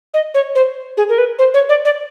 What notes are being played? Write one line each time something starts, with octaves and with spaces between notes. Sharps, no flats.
D#5
C#5
C5
G#4
A#4
B4
C5
C#5
D5
D5